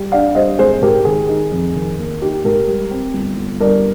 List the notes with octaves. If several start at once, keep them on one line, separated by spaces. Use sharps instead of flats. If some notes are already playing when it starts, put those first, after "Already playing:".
Already playing: G3
D4 D5 F5
G3 C5 D#5
G#1 G#4 C5
G#2 G4 A#4
D#3 G#4
D#4
F2
D#3
A#3
D#4 G4
G#2 G4 A#4
G3
C4
G1
G1
G2 A#4 D5